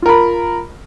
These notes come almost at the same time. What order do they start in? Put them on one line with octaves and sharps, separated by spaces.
F4 A#4 B5